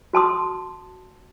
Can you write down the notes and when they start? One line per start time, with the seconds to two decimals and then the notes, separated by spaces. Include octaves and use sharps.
0.13 F#4 A5 C6 D#6